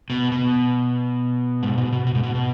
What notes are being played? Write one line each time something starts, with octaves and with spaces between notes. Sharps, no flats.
B2
B2
G#2
B2
B2
B2
G#2
B2